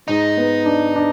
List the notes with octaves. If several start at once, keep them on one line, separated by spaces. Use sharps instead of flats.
G#2 D#4
B3
D4
D4